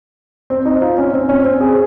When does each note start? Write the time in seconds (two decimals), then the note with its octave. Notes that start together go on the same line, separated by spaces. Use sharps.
0.50 C4
0.65 D#4
0.81 F4
0.98 C#4
1.13 C4
1.29 C#4
1.45 C4
1.61 G#4